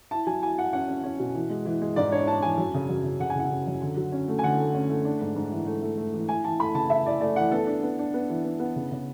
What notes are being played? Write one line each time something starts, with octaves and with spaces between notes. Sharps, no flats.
E4 A5
F#3 G#5
E4 G#5
E4 F#5
C#4 F#5
C#4
C#4
B2
E3
G#3
E3
G#3
G#2 D5
D4 C#5
D4 A5
E3 G#5
F#2
C#3
F#2
C#3
C#3 F#5
G#5
C#3 F#5
C#3
F#2
D3
F#3
C#4
A3
G#5
D3 F#5
A3
C#4
A3
D4
G#2
G#2
E3
A3
A3
A3
E3
E4 G#5
E3 A5
A3 B5
C#3 A5
E4 E5
E4 D5
A3 D5
E3 F#5
B3 A4
D4
B3
D4
B3
E3
B3
B3
C#3
C#3